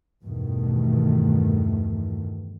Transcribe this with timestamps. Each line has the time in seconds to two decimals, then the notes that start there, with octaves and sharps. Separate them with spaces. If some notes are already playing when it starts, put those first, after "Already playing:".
0.24 E2 G2 B2 D#3 A3